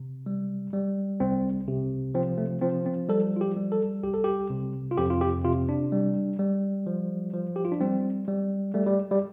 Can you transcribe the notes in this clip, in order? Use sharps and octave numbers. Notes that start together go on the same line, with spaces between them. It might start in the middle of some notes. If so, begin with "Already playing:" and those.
Already playing: C3
G3
G3
C2 C4
C3
F3 C4
A3
F3 C4
C4
G3 A4
F4
G4
G3
A4
C2 G4
A4
G4
C3
F4
F2 G4
F4
G4
C3 F4
D4
G3
G3
F3
F3
G4
F4
D4
G3 C4
G3
G3 A3
G3
G3